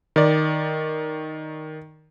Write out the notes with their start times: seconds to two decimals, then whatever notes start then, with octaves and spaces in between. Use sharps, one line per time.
0.16 D#3 D5